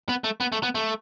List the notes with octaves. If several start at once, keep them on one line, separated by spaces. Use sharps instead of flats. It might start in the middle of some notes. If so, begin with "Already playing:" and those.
B3
A3
B3
A3
B3
A3